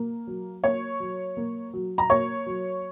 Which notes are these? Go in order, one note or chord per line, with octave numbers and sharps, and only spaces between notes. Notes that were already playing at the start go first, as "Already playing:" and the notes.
Already playing: A#3
F#3
A#3 C#5 C#6
F#3
A#3
F#3
A#5
A#3 C#5 C#6
F#3